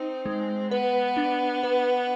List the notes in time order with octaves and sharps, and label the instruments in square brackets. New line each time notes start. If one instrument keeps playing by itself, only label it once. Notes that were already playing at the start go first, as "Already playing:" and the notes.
Already playing: [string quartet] C4 [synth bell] D#4
[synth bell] G#3
[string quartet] B3 [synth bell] B4
[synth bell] D4
B4